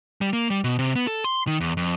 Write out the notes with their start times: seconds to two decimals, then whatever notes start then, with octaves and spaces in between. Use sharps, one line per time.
0.21 G3
0.33 A#3
0.50 G3
0.64 B2
0.79 C3
0.96 B3
1.07 A4
1.24 C6
1.47 D#3
1.61 E2
1.77 F2